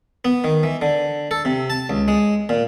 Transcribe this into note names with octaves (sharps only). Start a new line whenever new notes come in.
B3
D#3
E3
D3
A4
C3
A5
C#2
G#3
A#2